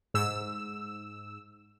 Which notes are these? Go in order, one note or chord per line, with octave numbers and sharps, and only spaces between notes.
G#2 E6